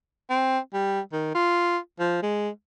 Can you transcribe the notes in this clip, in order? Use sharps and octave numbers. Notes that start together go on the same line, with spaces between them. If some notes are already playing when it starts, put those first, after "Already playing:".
C4
G3
D#3
F4
F3
G#3